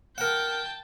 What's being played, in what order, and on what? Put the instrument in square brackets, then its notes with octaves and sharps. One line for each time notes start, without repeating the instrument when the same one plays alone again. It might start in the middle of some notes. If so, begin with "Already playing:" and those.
[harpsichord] A#4 F#5 [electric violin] G5 A5